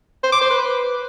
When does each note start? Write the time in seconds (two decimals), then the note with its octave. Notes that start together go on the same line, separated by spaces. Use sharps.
0.23 C5
0.32 D6
0.41 C5
0.50 B4